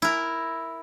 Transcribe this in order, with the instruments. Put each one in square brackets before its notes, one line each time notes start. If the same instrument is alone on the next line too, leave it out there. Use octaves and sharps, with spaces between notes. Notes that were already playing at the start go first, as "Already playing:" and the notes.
[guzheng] E4 A#4